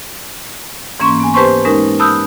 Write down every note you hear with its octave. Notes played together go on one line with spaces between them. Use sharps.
G#2 E3 A#3 C#4 C6 C#6
B3 G#5
G4 B4 C5 A5 C6 C#6
G#3 C#4 D#4 A#4
A5 B5 D#6 E6 F#6 G6